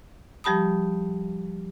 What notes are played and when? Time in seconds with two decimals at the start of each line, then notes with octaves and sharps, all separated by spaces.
0.44 F3 G3 G4 A5 B5 D#6